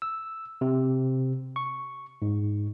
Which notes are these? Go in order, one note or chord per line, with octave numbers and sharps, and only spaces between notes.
E6
C3
C#6
G#2